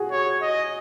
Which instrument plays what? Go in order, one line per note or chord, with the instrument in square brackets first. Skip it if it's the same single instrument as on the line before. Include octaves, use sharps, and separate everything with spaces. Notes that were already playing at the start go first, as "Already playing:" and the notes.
Already playing: [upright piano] F#4 G#4
[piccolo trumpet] C#5
D#5